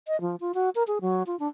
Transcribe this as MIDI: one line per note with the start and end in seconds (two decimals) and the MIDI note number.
0.08 0.19 75
0.21 0.36 53
0.40 0.52 65
0.54 0.69 66
0.75 0.83 70
0.87 0.99 68
1.01 1.23 54
1.26 1.38 65
1.39 1.48 62